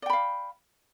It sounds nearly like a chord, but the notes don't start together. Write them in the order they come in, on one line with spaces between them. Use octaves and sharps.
D5 G5 B5 F5